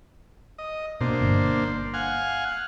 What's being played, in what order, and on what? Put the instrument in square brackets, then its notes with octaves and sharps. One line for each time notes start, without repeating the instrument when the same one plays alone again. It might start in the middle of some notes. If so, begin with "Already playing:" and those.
[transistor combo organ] D#5
[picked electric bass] B2 [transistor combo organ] A#3 D4 C5
[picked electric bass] G1
[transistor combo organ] F5 F#5 G#5